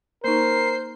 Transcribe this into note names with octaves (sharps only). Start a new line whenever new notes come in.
A#3 D#4 A#4 C5 C7